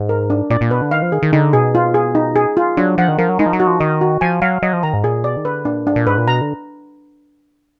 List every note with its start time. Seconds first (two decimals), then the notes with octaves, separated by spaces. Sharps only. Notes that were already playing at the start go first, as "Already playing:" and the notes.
Already playing: G#2
0.09 A#4
0.30 D4
0.50 A#2 D5
0.61 A#2
0.71 B2 B4
0.82 D3
0.91 D#3 F5
1.02 F3
1.12 D#3 G#4
1.22 D#3
1.33 D3 D#4
1.53 B2 G#4
1.75 F4
1.94 G#4
2.15 D#4
2.36 G#4
2.57 F4
2.77 F#3 D4
2.98 F3 F#5
3.08 D#3
3.18 F3 A#4
3.29 F#3
3.39 G#3 D#4
3.46 F3
3.53 F#3
3.60 F#4
3.67 F3
3.80 D#3 D#5
4.01 F#4
4.21 F3 G#5
4.42 F#3 F5
4.63 F#3 D#5
4.73 F3
4.83 D#3 A#5
4.94 G#2
5.04 A#2 G#4
5.24 B2 D5
5.37 D#3
5.45 D3 B4
5.65 A#2 D4
5.86 G#2 D4
5.96 A#2
6.07 G#2 B4
6.18 A#2
6.28 B2 A#5
6.41 D3